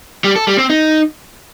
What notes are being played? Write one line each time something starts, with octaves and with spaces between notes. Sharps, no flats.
G3
A4
G3
C4
D#4